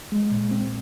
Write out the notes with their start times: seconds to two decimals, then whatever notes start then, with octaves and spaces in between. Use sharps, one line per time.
0.12 G#3
0.31 A#2
0.51 C4